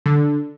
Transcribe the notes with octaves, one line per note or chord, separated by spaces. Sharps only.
D3